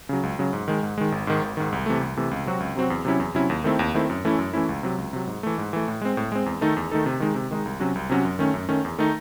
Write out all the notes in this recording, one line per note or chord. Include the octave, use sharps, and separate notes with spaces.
C#3 F#3
C#2
C#3 F#3
G#2
D#3 G#3
G#2
D#3 G#3
G#1
G#2 D#3
G#1
G#2 D#3
C2
C3 E3 A3
C2
C3 E3 A3
C#2
C3 F#3 C4 F#4
C#2
C3 F#3 C4 F#4
E2
C3 F#3 C#4 E4
E2
C3 F#3 C#4 E4
D#2
D#3 A3 C4 E4
D#2
D#3 A3 C4 E4
F#2
E3 A3 C#4 E4
F#2
E3 A3 C#4 E4
C#2
C3 F#3
C#2
C3 F#3
G#2
E3 A3
G#2
E3 A3
A2
G#3 C4
A2
G#3 C4
E2
D#3 A3 D#4 A4
E2
D#3 A3 D#4 A4
C3
D#3 G#3 D#4
C3
D#3 G#3 D#4
C2
C3 F#3 C#4 F#4
C2
C3 F#3 C#4 F#4
F#2
D#3 A3 C#4
F#2
D#3 A3 C#4
E2
D#3 A3 D#4